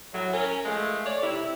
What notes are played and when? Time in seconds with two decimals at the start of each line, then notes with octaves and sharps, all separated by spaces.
0.13 A2 F#3
0.33 C#4 A#4
0.65 F3 G#3 A3
1.05 C#5 D5
1.22 C3 E4